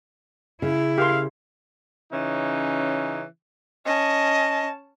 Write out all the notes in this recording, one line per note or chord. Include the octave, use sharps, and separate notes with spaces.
C#3 E4
G4 A#4 F5 C6
C#3 E3 C#4 D#4
C#4 D#5 A5